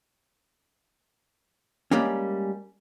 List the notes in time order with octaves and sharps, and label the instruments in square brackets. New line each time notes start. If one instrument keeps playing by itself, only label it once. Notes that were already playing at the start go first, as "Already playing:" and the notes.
[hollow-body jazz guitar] G3 G#3 A#3 C#4